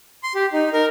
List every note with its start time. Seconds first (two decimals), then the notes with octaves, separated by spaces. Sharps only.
0.23 C6
0.35 G4
0.53 D#4
0.73 A#4